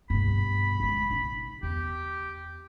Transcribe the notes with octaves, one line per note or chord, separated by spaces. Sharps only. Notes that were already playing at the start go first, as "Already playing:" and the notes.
G2 B2 B5
F#2 G#3
B2 D#4
E2 G4